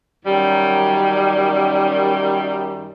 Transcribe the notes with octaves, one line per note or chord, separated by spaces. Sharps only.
F#2 D#3 G3